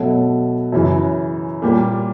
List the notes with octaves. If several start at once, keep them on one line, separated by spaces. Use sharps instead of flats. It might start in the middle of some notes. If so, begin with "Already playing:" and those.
Already playing: B2 F#3 A3
F#2 C#3 E3
A#2 G3 A#3